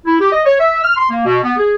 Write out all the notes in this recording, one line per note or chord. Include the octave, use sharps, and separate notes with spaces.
E4
G4
D#5
C#5
E5
F6
C6
A#3
B2
B3
G#4